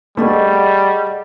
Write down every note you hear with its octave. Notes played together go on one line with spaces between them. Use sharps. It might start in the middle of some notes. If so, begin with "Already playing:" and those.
G3 A3 G#4 D#5 F#5